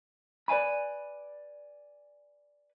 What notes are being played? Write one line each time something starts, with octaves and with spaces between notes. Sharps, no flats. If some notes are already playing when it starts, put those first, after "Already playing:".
B4 D5 F5 G#5 B5